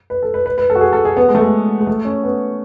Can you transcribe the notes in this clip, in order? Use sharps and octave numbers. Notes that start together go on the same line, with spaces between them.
B4
A4
B4
B4
B4
A4
F#4
G#4
A4
G#4
B3
G#3
A3
G#3
G#3
A3
C#4
B3